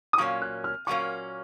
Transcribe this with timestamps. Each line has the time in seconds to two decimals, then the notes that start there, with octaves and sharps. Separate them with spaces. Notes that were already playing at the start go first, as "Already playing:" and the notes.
0.13 D#6
0.18 A#2 F#3 A#3 C#4 C#6
0.42 F#6
0.64 F6
0.87 A#2 F#3 A#3 C#4 C#6